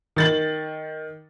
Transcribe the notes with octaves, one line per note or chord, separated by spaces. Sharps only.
D#3 A6 F#7